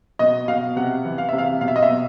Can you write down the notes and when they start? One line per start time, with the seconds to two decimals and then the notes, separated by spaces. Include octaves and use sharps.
0.19 B2 D#5
0.48 B2 F5
0.76 C3 F#5
1.05 E3
1.18 F5
1.29 C3 E5
1.38 F5
1.61 B2 F5
1.68 E5
1.76 D#5
1.83 E5
1.89 B2